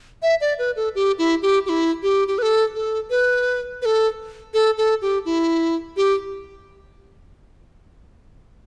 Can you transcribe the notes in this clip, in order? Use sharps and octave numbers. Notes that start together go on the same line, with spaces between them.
E5
D5
B4
A4
G4
E4
G4
G4
E4
G4
G4
B4
A4
A4
B4
B4
A4
A4
A4
G4
E4
G4